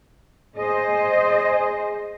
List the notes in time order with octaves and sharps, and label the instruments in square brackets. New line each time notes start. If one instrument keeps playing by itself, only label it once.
[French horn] G#4 [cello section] C5 D#5